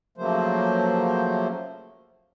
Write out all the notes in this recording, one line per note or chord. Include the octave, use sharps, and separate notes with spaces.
C#3 F3 F#3 A3 A#3 C5